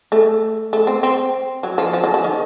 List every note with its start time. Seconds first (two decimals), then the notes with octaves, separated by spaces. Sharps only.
0.12 A3
0.73 A3
0.87 C4
1.03 C4
1.63 F#3
1.78 F3
1.93 F3
2.04 F#3
2.14 F3
2.24 D#3